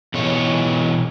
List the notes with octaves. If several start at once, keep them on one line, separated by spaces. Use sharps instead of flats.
B2 E3 C#5